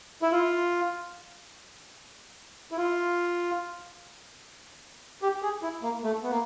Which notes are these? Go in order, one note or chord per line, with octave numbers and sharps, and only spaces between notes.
E4
F4
E4
F4
G4
G#4
E4
A#3
A3
B3
A#3